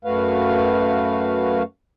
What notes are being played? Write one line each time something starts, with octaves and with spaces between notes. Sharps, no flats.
F#2 A3 F#4 B4 F5